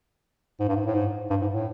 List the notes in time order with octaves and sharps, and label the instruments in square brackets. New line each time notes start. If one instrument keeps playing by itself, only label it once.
[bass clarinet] G#2
G2
G#2
A2
G#2
G2
G#2
A2